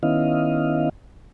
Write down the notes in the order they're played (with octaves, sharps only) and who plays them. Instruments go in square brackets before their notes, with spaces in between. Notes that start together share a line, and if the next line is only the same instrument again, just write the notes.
[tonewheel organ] D#3 B3 C#4 E4 D#5 F5